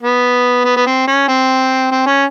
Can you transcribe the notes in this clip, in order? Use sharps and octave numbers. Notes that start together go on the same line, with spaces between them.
B3
B3
B3
C4
C#4
C4
C4
C#4